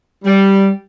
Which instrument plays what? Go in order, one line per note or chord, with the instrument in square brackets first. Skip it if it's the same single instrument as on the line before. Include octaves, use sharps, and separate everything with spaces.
[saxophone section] G3